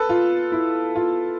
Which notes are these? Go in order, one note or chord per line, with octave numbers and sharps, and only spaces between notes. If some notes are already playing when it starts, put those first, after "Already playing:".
Already playing: A4 B4
F4
E4
F4